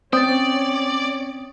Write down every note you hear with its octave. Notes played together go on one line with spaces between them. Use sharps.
C4 C#4 C#5 D5 G5 D#6 A6